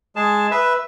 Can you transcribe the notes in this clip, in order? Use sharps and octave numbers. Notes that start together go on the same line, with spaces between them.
G#3 G#4 A5
B4 E5